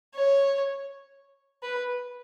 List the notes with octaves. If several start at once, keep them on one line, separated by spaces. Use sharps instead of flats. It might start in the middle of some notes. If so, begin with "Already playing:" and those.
C#5
B4